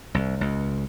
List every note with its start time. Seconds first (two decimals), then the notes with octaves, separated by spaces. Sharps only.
0.14 C2
0.41 C#2